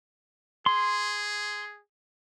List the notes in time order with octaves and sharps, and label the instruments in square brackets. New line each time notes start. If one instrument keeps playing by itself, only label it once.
[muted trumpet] G#4 [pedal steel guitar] C6